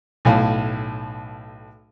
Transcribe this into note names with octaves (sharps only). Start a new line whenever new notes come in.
B1 A2 F5